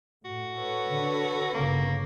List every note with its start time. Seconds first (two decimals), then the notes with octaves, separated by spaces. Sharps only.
0.25 A2 F#4
0.57 A4 B4 C#5
0.90 D3
1.54 G1 C#3 A#3